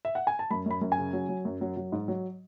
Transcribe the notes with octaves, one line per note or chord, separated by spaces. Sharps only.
E5
F#5
G#5
A5
F#2 B5
F#2 B5
F#2
G#5
C#3
F#3
F#3
F#2
F#3
F#3
G#2
F#3